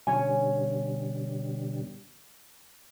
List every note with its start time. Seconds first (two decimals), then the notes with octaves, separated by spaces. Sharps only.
0.07 B2 D3 G3 C#4 C#5 G#5